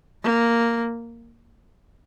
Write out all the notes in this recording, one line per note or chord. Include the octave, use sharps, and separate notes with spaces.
A#3